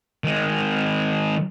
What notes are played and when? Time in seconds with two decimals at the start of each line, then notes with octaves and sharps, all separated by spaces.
0.24 D#3 G#3